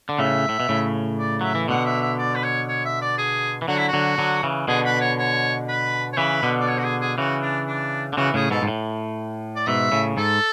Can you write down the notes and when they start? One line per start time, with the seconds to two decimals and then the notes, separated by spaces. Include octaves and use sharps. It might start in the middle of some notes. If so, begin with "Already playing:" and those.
0.09 D3
0.19 A2 C#3 E5
0.49 A2
0.60 B2
0.69 A2 C#3
1.19 D5
1.41 F#3 E5
1.55 E3
1.68 B2 D3 F#5
1.85 E5
2.01 E5
2.19 D5
2.35 B4
2.44 C#5
2.68 C#5
2.85 E5
3.02 D5
3.18 G#4
3.62 E3
3.68 D3 F#3 F#4
3.78 E4
3.88 F#4
3.93 D3 F#3
4.18 D3 F#3
4.43 C#3 E3
4.68 B2 D3 G#4
4.85 B4
5.01 C#5
5.19 C#5
5.69 B4
6.13 C#5
6.17 C#3 E3 B4
6.43 B2 D3
6.60 D5
6.68 C#5
6.79 F#4
6.84 G#4
7.01 G#4
7.18 C#3 E3 F#4
7.42 D4
7.67 D4
8.13 D3
8.17 C#3 E3 F#4
8.34 A2 C#3 G#4
8.51 G#2 B2 A4
8.62 G#2
8.68 A2
9.56 D5
9.67 G#2 B2 E5
9.92 A2 C#3
10.17 G#2 A4